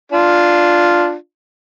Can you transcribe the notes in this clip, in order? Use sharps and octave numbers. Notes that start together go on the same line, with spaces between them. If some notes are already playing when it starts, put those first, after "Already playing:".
D4 F4